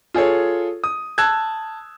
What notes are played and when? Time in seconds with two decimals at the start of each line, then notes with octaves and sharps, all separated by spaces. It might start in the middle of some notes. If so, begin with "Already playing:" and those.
0.14 F4 G#4 A4 C#5
0.84 D#6
1.18 A5 E6 F#6 G#6